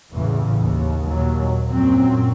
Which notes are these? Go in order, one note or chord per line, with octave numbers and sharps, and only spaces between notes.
A1 E2 A2 C#3 E3
D#2
D#2 A#2 F#3
F#2 A#2 F#3 C4